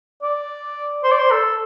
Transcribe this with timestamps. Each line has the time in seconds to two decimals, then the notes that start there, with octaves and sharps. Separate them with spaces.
0.22 D5
1.04 C5
1.11 D5
1.19 C5
1.31 A4